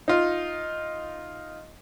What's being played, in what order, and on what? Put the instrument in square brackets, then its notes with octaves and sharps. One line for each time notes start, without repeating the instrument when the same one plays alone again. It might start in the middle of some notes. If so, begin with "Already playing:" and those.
[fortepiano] D#4 F4